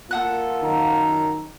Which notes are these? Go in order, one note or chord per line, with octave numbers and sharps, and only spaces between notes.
A#3 F4 A4 F#5 F#6
F#2 D#3 A#5